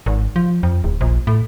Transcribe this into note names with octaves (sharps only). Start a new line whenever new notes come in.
G#1
F3
F2
D1
A#1
A2